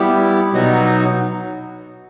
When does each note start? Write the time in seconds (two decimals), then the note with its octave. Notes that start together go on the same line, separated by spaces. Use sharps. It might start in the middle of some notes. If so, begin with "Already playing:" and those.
Already playing: G3 B3 E4 G4
0.53 B2 F#3 B3 D#4 F#4